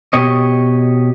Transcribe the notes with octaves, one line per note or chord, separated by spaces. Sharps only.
B2 G4 C#5 D#5